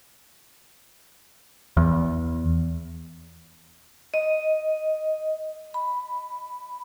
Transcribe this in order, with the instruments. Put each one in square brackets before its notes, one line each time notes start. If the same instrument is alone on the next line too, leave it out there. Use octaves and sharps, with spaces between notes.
[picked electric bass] E2
[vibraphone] D#5
B5